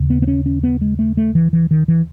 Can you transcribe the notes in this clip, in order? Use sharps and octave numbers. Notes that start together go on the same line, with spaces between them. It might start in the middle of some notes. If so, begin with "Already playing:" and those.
Already playing: D#2 C#3
B3
B3
C#4
C#4
B3
G#3
A3
A3
E3
E3
D#3
E3